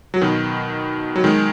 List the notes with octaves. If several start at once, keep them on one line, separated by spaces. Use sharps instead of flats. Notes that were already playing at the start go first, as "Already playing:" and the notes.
F#3
B2 D#3
F#3
D#3 G#3